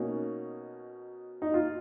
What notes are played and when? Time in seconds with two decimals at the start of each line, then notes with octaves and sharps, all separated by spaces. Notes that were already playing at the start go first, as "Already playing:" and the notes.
Already playing: B2 A#3 C#4 D#4
1.42 D#4
1.54 F4